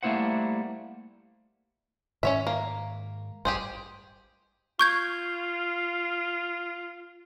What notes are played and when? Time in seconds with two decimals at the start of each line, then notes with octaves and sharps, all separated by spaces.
0.03 G3 A3 A#3 E4 C5 F#5
2.23 G#2 D#3 G#3 C#4 C#5 E5
2.47 A#3
3.45 A1 G2 G4 G#4 C5
4.79 F4 C#6 G6 G#6